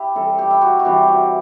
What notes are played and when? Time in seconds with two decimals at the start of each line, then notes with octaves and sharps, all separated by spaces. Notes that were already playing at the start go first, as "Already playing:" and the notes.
Already playing: E4 G4
0.15 C3 E3 G3 A4
0.39 G4
0.50 E4
0.61 F#4
0.79 F#4
0.85 C3 E3 G3 G4
1.08 F#4